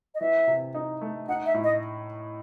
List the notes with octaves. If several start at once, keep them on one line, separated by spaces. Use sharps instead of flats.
D#5
E3 E5
C3
D#4
A3
D#4 F#5
E5
A2
D#5